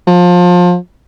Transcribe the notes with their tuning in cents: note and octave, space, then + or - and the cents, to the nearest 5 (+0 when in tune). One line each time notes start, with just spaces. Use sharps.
F3 +25